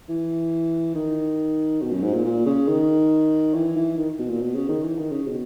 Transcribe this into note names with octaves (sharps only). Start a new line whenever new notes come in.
E3
D#3
B2
F#2
G#2
A#2
A#2
C#3
D#3
E3
E3
D#3
B2
A#2
B2
C#3
D#3
E3
D#3
C#3
B2